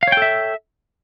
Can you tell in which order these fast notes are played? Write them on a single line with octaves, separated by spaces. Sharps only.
F5 C#5 G5 A4 E5